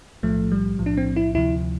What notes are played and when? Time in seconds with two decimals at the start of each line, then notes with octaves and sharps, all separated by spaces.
0.23 B1 A2 F3 A3
0.52 G3
0.79 B1 A2 F3
0.86 D4
0.97 C4
1.16 E4
1.35 D2 C3 F3 E4